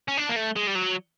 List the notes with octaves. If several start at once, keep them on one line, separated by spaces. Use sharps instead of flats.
C#4
D4
A#3
A3
G#3
G3
F#3